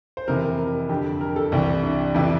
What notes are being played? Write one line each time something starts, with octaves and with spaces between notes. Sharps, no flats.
C5
F2 C3 E3 A#4
A#4
F2 D3 G4
A#4
A4
C2 C3 E3 G4
D4
F2 C3 E3 E4